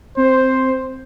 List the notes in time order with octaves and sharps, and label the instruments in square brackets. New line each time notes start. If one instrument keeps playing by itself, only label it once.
[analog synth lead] C4 [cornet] C5